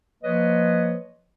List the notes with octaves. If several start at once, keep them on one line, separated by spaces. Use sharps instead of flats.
F3 A#3 B4 C#5 D#5